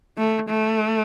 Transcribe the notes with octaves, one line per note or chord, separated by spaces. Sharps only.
A3
A3